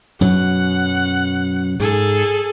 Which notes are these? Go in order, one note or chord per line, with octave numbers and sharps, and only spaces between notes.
F#2 B2 F#3 F#5
G#2 G#4 A4